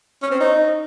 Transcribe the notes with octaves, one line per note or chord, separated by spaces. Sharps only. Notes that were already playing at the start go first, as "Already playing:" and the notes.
C#4
C4
D#4